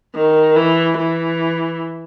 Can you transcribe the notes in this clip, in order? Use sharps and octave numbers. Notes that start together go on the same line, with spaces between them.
D#3
E3
E3